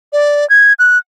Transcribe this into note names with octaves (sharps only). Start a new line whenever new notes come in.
D5
G#6
F#6